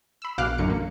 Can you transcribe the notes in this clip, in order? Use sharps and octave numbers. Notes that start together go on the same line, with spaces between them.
B5 E6
A#1 B2 F5 D6 F6 F#6
A1 F#2 D3 F#3 C#7
A#3